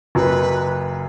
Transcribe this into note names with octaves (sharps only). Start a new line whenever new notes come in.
F#1 F#2 F#3 B4